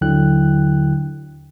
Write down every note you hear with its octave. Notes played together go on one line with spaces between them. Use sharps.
D#2 D3 F#3 E4 G5 F#6